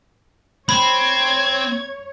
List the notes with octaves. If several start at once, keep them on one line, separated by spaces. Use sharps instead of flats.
C4 C#5 B5 G#6